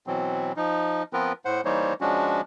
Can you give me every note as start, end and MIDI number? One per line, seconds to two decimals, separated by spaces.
0.07 0.52 47
0.07 0.52 52
0.07 0.52 54
0.07 0.52 60
0.57 1.03 53
0.57 1.03 63
1.13 1.33 53
1.13 1.33 59
1.13 1.33 60
1.13 1.33 65
1.13 1.33 70
1.13 1.33 71
1.45 1.61 45
1.45 1.61 72
1.45 1.61 78
1.65 1.94 52
1.65 1.94 55
1.65 1.94 58
1.65 1.94 63
1.65 1.94 72
1.65 1.94 73
2.01 2.41 53
2.01 2.41 56
2.01 2.41 61
2.01 2.41 62
2.01 2.41 66